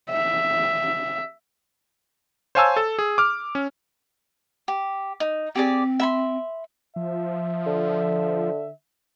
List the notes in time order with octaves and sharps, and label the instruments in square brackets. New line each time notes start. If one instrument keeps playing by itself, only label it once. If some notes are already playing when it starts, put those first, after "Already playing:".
[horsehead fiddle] E5
[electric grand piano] C5 C#5 F5 G#5 A5 E6
A4
G#4
D6 F6
C#4
[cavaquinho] G4
D#4
[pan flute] C4 [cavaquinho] G4 G#4 D5
[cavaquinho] E5 B5 C6
[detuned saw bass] F3 [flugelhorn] E5
[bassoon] D3